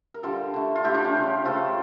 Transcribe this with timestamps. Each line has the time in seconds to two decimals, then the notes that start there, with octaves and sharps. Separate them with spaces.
0.14 A#4
0.23 D3 G3 F4 A4
0.54 D3 A3
0.75 F4
0.84 D3 A3 E4 G4
0.94 D4 F4
1.04 C#4
1.15 C#3 G3
1.45 C#3 F3 A3 F4 A4